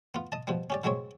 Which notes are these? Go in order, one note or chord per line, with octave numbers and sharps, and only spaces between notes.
B3 F4
D#5 A5
B2 F3 G3
C#4 G4 D5
C#3 F#3 G#3 C4 C#5